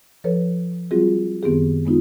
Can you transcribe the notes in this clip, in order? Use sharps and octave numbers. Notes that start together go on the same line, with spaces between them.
F3 A4 B4 C#5
F#3 G3 C4 F4 F#4 G#4
F#2 D#3 B3 C4 G4 G#4
G#3 B3 D#4 F4